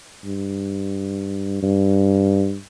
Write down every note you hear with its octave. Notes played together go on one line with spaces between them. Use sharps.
G2
G2